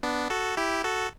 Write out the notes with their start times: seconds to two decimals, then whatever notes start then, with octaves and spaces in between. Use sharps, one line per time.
0.03 B3 D4
0.30 F#4 A4
0.57 E4 G4
0.84 F#4 A4